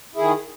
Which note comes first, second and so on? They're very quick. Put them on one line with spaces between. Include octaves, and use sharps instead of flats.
E4 G#4 D#3